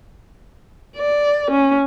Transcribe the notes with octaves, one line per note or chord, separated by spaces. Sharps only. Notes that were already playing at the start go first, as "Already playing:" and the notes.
D5
C#4